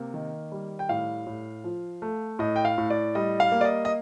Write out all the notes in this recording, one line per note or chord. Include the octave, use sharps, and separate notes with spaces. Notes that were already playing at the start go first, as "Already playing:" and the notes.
Already playing: C3 A#3
D#3
G3
G5
A2 F5
A2
F3
A3
A2 D#5
G5
F5
A2
D5
G3 D#5
F5
A#3
D5
D#5
D#5